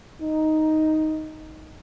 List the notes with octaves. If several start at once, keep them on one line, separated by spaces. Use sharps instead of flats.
D#4